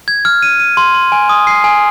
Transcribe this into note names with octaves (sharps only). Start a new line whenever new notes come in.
G#6
F6
D#7
D#7
C6
C6
G#5
D#6
C7
G#5